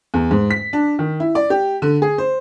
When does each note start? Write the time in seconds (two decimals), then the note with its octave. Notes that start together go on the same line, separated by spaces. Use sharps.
0.14 E2
0.31 G#2
0.51 B6
0.73 D4
0.99 D#3
1.20 E4
1.35 D5
1.50 G4
1.82 D3
2.02 G#4
2.18 C5